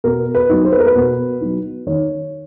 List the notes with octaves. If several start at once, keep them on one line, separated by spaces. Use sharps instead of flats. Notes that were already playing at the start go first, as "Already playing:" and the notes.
B2 A#4
B4
F#3 B3 D#4
C5
B4
A#4
B4
B2
F#3 B3 D#4
D#3 C#5